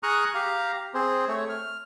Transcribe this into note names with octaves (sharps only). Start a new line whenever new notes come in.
G#4 A#5 C#6 D#6 F6 F#6
G4 F5 A#5
C4 G#4 C5
A3 C#5
F6